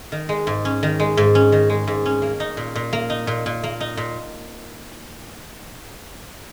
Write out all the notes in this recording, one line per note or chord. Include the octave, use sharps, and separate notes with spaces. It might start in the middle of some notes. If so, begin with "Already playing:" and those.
D#3
G#3
G#2
C#4
D#3
G#3
G#2
C#4
D#3
G#3
G#2
C#4
A#3
D#4
A#2
A#2
A#3
D#4
A#2
A#2
A#3
D#4
A#2